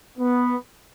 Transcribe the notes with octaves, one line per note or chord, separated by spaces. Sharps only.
B3